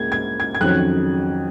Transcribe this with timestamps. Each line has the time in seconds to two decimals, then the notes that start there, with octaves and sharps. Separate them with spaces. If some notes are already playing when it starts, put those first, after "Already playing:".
Already playing: C#2 A#3 G#6
0.12 G#6
0.40 G#6
0.55 G#6
0.61 F2 D#3 F#3 C#4 F#6